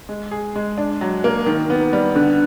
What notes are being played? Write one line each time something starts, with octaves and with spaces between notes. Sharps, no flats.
G#3
G#4
G#3
D4
F#3
A#3
D#3
B3
G3
D3